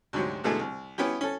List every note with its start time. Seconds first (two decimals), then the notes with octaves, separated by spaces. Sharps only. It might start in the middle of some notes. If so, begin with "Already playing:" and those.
0.13 D2 G#2 C3 F#3
0.44 G#2 B2 D3 A3 G#4
0.59 C2
0.98 B3 C#4 E4 G4
1.21 C#4 A4